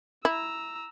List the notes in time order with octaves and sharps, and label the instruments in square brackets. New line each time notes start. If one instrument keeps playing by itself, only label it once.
[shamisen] E4 [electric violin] A#5 E6